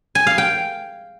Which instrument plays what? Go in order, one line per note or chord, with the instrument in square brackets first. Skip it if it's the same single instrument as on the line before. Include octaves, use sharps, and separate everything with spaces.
[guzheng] G#5
F5
G5